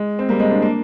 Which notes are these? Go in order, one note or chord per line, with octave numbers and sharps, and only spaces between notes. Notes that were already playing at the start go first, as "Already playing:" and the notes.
Already playing: G#3
C4
G3 A#3
G#3 C4
A#3 D4
A#3 D4